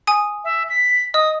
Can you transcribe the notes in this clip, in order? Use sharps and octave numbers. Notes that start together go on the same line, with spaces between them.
G#5 D#6
E5
B6
D#5 D#6